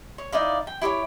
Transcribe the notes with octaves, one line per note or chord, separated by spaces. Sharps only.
C#5
D#4 E4 D5 F5
G5
E4 G4 C5 C#5